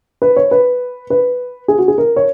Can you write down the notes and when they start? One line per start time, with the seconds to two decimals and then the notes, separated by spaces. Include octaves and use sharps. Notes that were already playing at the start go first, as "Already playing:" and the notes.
0.22 B4
0.36 C#5
0.51 B4
1.10 B4
1.68 G#4
1.78 F#4
1.88 G#4
1.98 A#4
2.16 C#5